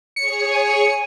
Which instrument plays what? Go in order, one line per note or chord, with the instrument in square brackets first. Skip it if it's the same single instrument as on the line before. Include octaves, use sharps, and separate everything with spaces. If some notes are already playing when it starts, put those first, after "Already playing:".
[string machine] G#4 C#5 [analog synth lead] C#7
[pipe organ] G#5